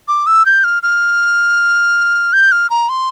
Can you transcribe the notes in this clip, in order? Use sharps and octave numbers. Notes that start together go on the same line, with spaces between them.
D6
E6
G6
F6
F6
G6
F6
A#5
C6